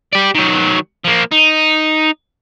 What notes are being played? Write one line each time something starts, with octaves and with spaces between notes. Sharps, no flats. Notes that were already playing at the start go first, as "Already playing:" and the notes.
G4 D5
D#3 F#3
F3 A#3
D#4